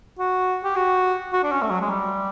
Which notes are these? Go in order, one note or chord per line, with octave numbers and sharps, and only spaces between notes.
F#4
G4
F#4
F#4
D4
C#4
A3
F#3
G#3
G3